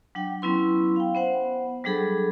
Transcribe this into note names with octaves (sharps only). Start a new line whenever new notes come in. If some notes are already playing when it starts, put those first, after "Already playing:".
F#3 D4 G5
F#3 B3 C#4 E4 B4 C6
F5 G5
B3 C5 F#5
F#3 G3 D4 G#4 A4 B5